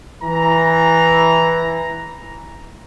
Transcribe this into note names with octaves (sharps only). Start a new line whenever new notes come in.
E3 A#5